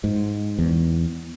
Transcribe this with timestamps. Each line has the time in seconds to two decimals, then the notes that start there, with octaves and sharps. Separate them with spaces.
0.04 G#2
0.59 E2